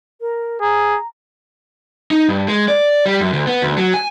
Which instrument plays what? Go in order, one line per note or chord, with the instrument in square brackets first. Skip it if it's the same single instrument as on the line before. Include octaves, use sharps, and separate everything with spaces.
[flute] A#4
[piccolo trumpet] G#4 [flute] A#5
[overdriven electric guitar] D#4
G2
G#3
D5
G3
F#2
D2
B3
D2
F#3
G#5